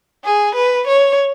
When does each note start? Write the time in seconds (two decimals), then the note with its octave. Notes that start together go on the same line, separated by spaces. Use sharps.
0.25 G#4
0.55 B4
0.87 C#5